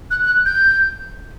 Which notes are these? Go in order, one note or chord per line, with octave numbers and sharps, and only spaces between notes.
F#6
F#6
G6